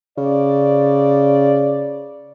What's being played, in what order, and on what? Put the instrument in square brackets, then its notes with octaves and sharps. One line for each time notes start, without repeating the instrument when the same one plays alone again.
[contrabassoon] C#3 [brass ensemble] D5